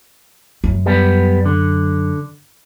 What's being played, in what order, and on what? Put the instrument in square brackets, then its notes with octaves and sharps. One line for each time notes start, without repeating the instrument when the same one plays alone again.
[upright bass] F#2
[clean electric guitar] G3 B3
D3